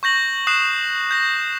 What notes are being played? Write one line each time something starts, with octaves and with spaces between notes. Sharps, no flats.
C#6 G6 A#6 F#7
D#6 F#6 C7 E7
G6 A#6